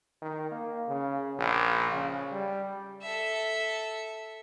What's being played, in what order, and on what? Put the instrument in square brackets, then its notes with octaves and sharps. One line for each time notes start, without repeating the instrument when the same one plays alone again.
[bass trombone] D#3
A#3
C#3
A#1
C#3
G3
[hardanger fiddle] A4 E5